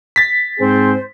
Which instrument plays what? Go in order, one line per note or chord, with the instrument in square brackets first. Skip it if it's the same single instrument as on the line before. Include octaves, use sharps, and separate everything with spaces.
[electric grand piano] A6 B6
[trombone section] G#2 C4 G#4 [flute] C5